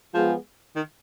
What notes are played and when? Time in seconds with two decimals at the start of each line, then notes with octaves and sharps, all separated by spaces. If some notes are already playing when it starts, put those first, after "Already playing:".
0.14 F3 G#3 B3 F4 G#4
0.76 D#3